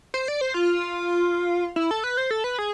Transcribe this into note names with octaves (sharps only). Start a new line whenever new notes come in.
C5
D5
C5
F4
E4
A4
B4
C5
A4
B4
G#4